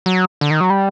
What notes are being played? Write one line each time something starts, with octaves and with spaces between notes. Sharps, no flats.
F#3
D3
D#3
F#3
G3